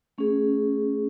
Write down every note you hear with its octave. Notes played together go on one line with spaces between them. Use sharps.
A3 C#4 G#4